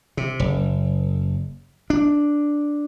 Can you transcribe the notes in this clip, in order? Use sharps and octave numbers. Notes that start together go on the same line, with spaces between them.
C3
F#1
D4